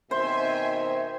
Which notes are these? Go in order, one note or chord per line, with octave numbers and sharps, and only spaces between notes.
B2 D#3 C4 C5 E5 G#5